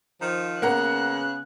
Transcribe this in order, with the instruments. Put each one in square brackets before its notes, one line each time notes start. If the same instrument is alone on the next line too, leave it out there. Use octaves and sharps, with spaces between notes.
[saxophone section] D#3 F3
[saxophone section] C#3 B3 [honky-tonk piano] A#3 F#5 A#5 [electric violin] F#6